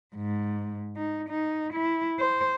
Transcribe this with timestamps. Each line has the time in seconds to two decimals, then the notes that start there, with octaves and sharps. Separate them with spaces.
0.16 G#2
0.97 D#4
1.29 D#4
1.74 E4
2.19 C5